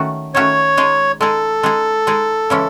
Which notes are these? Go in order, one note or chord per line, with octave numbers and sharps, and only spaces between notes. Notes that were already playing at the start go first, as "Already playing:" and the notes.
Already playing: D#3 A3 C#4 F#4
D#3 A3 C#4 F#4 C#5
G#3 D#4 G#4
G#3 D#4 G#4 A4
G#3 D#4 G#4
G#3 D#4 G#4
C#3 E3 G#3 C#4